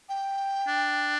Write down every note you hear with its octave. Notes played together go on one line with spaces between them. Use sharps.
G5
D4